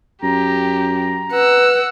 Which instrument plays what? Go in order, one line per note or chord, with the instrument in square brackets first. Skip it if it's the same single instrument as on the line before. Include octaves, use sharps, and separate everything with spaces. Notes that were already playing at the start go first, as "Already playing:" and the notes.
[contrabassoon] F#2 [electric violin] G4 [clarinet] A#5
[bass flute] B4 [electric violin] F#5 E6